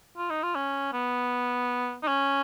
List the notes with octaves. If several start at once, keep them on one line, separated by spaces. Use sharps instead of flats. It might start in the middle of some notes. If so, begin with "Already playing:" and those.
F4
D#4
F4
C#4
B3
D#4
C#4